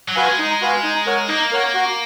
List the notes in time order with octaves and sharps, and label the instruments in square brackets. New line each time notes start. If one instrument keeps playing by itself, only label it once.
[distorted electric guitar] F#3
[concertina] F#4 B4 F5 G#5
[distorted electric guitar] G#3
[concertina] D#4
F#4 B4 F5 G#5
D#4
A#4 C#5 F#5
[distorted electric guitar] A#3 [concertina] D#4
[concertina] A#4 C#5 F#5
F#4